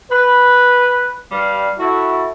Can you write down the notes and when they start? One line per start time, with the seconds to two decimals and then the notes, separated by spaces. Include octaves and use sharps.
0.11 B4
1.31 G2 G3 F5
1.78 E4 F#4 A4